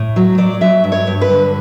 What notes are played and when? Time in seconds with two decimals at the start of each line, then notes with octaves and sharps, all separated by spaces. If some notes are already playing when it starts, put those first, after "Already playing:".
Already playing: A2
0.16 F#3
0.38 F#3 D5
0.61 F#3 E5
0.84 G2
0.92 C#5
1.07 G2
1.21 B4
1.30 D3